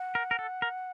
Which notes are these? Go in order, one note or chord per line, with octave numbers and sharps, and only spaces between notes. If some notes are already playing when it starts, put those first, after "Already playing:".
Already playing: F#5
A#4
A#4
A4
A#4